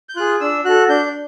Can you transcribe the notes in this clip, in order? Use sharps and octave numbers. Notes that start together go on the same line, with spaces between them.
G6
F4 G#4 F#6
D4 E6
F#4 A4 F#6
D4 G6